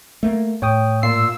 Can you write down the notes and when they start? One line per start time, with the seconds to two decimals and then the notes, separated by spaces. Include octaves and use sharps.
0.23 A3 A#3
0.62 A2 C#5 G5 D#6
1.03 A#2 F4 E6 C7